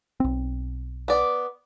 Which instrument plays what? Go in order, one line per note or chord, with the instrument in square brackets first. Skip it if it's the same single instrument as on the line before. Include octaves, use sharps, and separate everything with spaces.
[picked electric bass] B1 C4
[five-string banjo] B3 D5